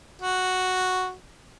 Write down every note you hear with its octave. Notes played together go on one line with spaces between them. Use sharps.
F#4